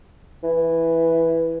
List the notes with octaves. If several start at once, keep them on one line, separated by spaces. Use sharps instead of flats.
E3